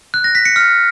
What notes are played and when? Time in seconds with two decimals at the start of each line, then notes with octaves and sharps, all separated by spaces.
0.14 F#6
0.24 A#6
0.35 B6
0.45 C#7
0.56 F6